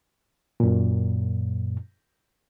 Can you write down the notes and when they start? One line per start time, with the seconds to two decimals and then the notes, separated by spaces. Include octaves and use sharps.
0.60 F#2 A#2